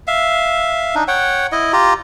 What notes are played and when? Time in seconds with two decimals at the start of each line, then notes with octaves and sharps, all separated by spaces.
0.07 E5 F5
0.95 D4 D#4
1.08 C#5 F#5 G5
1.52 E4 D#5
1.73 F4 G4 A#5